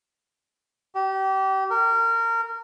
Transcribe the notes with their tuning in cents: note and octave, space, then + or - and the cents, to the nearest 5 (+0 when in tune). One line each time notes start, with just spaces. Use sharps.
G4 -30
A#4 -25